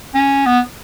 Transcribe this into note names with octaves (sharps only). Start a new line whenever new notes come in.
C#4
B3